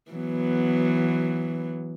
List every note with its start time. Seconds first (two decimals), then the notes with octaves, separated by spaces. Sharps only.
0.12 E3 F#3 B3